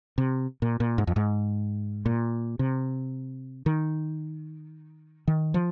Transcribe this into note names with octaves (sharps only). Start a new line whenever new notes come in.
C3
A#2
A#2
G#2
F2
G#2
A#2
C3
D#3
D#3
F3